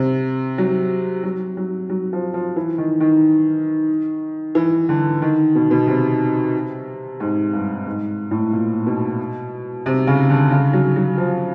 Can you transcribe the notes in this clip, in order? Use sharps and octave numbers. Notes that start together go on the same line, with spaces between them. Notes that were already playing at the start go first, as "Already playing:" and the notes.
Already playing: C3
F#3
F#3
F#3
F#3
F3
F3
E3
D#3
D#3
E3
D3
D#3
B2
B2
C3
G#2
G2
G#2
A2
A#2
B2
C3
C#3
D3
C#3
F#3
F#3
F3